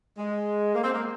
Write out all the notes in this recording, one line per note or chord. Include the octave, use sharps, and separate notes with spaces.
G#3
A#3
C4
A#3